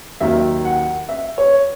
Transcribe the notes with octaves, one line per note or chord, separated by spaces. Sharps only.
D#2 D#3 F#3 E5
F#5
E5
C#5